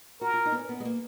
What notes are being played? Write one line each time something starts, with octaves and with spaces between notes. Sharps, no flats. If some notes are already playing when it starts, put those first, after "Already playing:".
F#4 A#4
F4
D#4
B3
C#4
B3
G#3
A#3